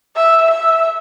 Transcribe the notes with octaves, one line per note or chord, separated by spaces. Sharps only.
E5
E5